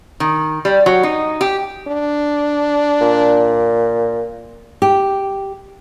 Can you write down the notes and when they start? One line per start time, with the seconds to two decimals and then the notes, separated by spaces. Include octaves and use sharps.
0.20 D#3
0.65 G3
0.86 F#3
1.03 D#4
1.41 G4
1.88 D4
3.01 A#2
4.82 G4